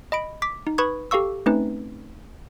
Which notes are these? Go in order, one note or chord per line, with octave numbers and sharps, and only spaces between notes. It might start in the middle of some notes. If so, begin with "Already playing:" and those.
D#5 B5 D7
D6 B6
D#4
B4 B5 C#6 D#6 G#6
G4 A4 F5 C#6 E6
A3 C4 C#4 D#4 B4